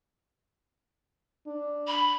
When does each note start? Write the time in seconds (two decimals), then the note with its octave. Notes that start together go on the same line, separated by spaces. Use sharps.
1.47 D4
1.87 B5